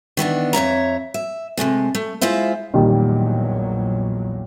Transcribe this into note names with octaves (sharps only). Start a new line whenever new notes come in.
D#3 E3 B3 D4
F2 C#5 E5 A#5
E5
C3 E3 G#3 A3
A3
G#3 E4 F4 C5 E5
A#1 E2 A#2 D#3 F#3 G3